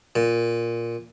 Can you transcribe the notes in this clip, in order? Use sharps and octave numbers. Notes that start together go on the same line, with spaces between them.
A#2